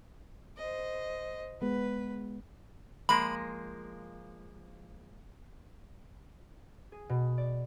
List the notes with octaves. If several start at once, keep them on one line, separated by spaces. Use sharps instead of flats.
C5 D#5
G#3 B3 B4
F3 G#3 A#3 B5
G#4
B2
D5